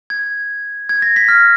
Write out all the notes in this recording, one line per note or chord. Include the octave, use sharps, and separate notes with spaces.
G#6
G#6
A#6
B6
F6